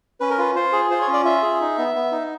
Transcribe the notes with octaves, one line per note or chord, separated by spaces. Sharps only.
C#4 B4
A#4
F4 B4
F4 C5
G#4
F4 C5
C#5
C#4
D5
F4 E5
G#4
D#4
B3
B3
D#4